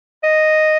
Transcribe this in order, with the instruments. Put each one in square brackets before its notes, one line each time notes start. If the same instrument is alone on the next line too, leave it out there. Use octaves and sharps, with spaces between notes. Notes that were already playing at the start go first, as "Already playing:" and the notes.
[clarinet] D#5